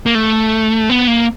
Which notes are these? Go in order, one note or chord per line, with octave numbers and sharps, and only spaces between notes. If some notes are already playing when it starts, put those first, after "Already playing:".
A#3
A3
B3
A#3